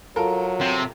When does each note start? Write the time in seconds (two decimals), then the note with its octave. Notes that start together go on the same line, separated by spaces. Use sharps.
0.16 F#3 F4 A4 A#4
0.61 C3